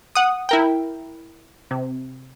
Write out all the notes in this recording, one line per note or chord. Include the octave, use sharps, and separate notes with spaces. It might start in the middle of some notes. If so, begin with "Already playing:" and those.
F#5 D#6
E4 A#4 G5
C3